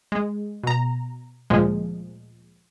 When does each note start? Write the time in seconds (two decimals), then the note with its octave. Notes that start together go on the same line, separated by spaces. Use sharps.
0.12 G#3
0.63 B2 A#5
1.50 D2 A#2 F3 G#3